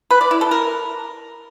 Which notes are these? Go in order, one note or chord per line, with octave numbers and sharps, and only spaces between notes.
B4
D5
E4
A4
A#4